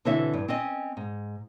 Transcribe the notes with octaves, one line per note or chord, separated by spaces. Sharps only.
B2 D3 E3 C4 C#5 E5
G2
C4 C#4 D#5
G#2